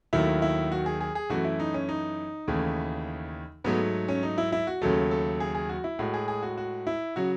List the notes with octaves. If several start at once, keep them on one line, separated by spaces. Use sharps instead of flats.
D#2 D#3 F#3 A3 E4
E4
F#4
G#4
G#4
G#4
F#2 E3 A3 F#4
E4
D#4
C#4
D#4
D#2 C#3 E3 A3
G#2 F#3 A3 B3
C#4
D#4
E4
E4
F#4
D#2 C#3 F#3 A3 A4
A4
G#4
G#4
F#4
E4
A2 G#3 F#4
G#4
G#4
F#4
F#4
E4
C#3 F#3 F#4